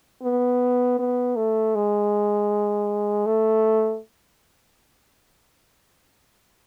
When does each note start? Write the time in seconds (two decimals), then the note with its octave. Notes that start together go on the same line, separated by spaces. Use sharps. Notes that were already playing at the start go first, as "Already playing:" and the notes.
0.22 B3
0.99 B3
1.36 A3
1.75 G#3
3.26 A3